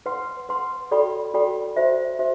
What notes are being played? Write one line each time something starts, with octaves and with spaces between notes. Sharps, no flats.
B4 F#5 C6
B4 F#5 C6
F#4 A4 D5 G5 B5
F#4 A4 D5 G5 B5
F#4 C5 E5
F#4 C5 E5